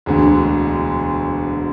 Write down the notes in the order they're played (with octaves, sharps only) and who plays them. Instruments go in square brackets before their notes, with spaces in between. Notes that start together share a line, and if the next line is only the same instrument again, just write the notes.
[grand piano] E1 D2 D3